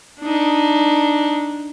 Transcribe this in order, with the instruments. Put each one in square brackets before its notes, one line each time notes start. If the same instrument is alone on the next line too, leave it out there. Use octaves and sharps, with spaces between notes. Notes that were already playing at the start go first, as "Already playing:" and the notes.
[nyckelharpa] D4 D#4